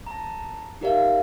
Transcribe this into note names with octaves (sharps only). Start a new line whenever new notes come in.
A5 A#5
D#4 G4 A#4 D5 E5 F5